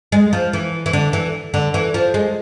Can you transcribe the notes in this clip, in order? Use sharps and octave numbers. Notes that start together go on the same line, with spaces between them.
G#3
F3
E3
E3
D3
E3
D3
E3
F3
G#3